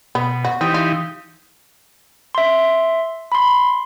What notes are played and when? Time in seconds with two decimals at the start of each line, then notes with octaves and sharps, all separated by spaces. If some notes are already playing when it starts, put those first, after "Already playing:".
0.15 B2 B3
0.45 F#4
0.61 E3 C4 D#4 G4
0.74 F4
2.35 E5 C6
3.32 B5 C6